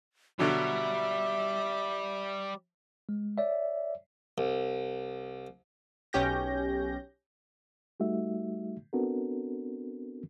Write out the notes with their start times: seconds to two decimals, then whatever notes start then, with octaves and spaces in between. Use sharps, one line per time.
0.39 B2 D3 F#3 G3 E5 D6
3.09 G#3
3.38 C#5 D5 E5
4.38 C2
6.13 B1 C#4 G4 G6 A#6
8.00 G3 A3 D#4 F#4 E5
8.93 B3 C4 D4 F#4 A4 A#4